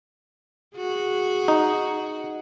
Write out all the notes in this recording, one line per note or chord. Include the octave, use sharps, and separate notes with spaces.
F#4 G#4
D#4